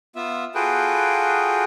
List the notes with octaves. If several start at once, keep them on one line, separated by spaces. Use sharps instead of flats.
B3 F4 E5
F4 F#4 G#4 A4 B4 G5